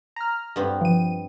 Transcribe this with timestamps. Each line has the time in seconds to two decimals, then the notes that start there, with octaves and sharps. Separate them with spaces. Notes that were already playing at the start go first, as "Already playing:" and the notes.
0.16 A#5 F6
0.56 G2 B3 C4
0.81 F3 D#7